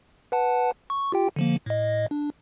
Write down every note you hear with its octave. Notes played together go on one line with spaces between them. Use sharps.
B4 F#5 A5
C#6
F4 G4 G5
D3 F3 A#3
A2 D#5
D4